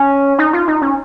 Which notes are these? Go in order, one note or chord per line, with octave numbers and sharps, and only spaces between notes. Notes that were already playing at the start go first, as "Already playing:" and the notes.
Already playing: C#4
D#4
F4
D#4
C#4